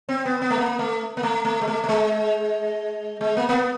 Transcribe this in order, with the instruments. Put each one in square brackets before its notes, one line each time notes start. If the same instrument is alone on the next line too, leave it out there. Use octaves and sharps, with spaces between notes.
[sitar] C4
B3
B3
A3
A#3
A3
A#3
A3
A3
G#3
A3
A3
G#3
G#3
A#3
A#3
B3